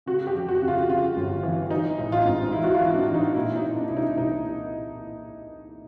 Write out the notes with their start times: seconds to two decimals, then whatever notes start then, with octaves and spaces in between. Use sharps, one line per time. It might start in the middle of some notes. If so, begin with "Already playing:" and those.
0.06 C#3 F#4
0.27 G4
0.35 F2
0.48 F#4
0.62 C#3
0.68 F4
0.89 C#3 F4
1.17 G1
1.43 E3
1.70 E3 D#4
1.98 A1
2.12 F4
2.25 G#2
2.52 E3 E4
2.64 F#4
2.74 F4
2.80 E3
2.94 D4
3.08 E3
3.14 D#4
3.35 A#2 E4
3.56 D#4
3.62 A#2
3.76 D4
3.88 C2 E4
3.97 D#4
4.17 C2 D#4